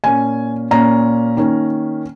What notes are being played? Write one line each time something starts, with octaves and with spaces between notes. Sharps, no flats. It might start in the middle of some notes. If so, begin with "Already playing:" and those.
A#2 A#3 C#4 G#5
A#2 A#3 C#4 A#5
D#3 A#3 C#4